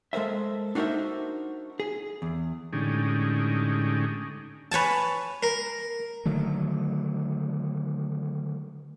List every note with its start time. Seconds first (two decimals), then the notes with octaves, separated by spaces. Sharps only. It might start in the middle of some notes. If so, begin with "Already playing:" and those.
0.13 G#3 A4 A#4 C5 E5
0.75 D4 D#4 F#4 A#4 C5 E5
1.80 G#4
2.22 E2
2.73 A2 D3 G#3 C#4 D#4 G4
4.71 B4 C#5 G#5 A5
5.43 A#4
6.26 D3 D#3 F#3 A3